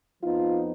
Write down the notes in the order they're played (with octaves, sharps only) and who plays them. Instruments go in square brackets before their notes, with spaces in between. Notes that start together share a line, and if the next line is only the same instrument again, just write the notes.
[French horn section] F2 F3 B3 D#4 F4